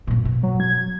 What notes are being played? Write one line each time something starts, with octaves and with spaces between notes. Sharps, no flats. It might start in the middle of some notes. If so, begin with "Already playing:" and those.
F#2 A#2
B2
F#3
G#6